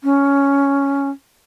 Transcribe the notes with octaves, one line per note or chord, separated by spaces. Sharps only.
C#4